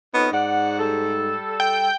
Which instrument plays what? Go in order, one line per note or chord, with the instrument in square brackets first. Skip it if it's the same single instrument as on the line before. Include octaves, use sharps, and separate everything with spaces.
[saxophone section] F2 C#4 D#4 [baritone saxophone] B3
[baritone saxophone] G#2 [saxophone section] D5 F#5
[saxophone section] G3 A4
[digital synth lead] G5